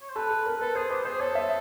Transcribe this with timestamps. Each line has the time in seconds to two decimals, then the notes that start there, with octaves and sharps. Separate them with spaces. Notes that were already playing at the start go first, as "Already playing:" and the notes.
0.01 C#5
0.09 C5
0.16 A4 B4
0.31 A4
0.46 A#4
0.61 A4 B4
0.75 G#4 C5
0.90 G4 B4
1.05 G#4 C5
1.20 A4 C#5
1.35 E5